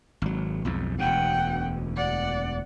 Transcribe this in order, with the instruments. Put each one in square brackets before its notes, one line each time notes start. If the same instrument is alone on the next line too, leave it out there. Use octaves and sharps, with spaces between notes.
[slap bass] G#1 F#3
B1 F2 G#2
[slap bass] E1 D2 B2 [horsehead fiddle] F#5 G5
[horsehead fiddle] D5 F#5